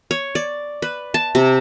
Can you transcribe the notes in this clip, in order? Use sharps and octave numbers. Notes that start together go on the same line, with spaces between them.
C#5
D5
B4
A5
C3